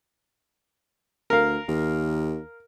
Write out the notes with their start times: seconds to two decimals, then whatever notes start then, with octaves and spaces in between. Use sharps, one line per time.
1.30 D2 A#4 F5
1.68 D#2